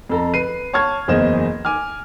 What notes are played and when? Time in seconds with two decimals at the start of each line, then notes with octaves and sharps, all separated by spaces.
0.10 F2 A4 A#5
0.34 B4 C7 D#7
0.73 C#5 A5 C#6 F6 G#6
1.08 F#1 E2 C5 D#5 E7
1.65 G#5 D6 F6